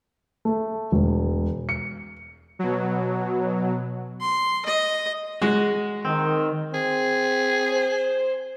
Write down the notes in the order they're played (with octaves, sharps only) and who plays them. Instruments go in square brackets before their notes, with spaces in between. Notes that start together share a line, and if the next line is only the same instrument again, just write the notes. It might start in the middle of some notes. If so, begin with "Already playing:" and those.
[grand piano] A3
E1
C#7
[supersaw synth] B2 F#3
[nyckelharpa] C6
D#5
[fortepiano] G#3 [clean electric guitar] F#4
[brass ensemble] D#3 [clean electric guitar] C4
[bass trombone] C4 [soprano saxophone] G#4
[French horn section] C5